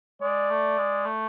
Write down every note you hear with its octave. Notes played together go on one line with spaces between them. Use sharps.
G#3 D5
A3
G#3
A3